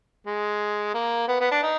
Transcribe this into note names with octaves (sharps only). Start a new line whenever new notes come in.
G#3
A#3
B3
B3
D4
D#4